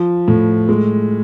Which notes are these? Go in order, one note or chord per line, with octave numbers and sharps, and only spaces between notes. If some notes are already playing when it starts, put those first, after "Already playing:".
Already playing: F3
A2
G#3